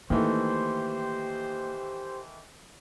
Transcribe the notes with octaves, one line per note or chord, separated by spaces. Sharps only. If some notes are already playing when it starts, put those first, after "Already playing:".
D#3 E3 A3 A#3 G4 C5